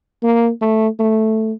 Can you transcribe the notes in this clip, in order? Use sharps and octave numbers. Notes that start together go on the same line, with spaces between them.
A#3
A3
A3